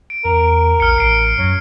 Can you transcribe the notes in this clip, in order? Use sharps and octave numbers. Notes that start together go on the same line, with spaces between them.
D7
E2 A#4
A#1 F6 C#7
A1 C7 D7
F#2 F#3